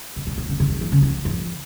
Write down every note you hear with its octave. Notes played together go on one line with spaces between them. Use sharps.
C3
A#2
A#2
C#3
C#3
D#3
F3
C#3
F3
F3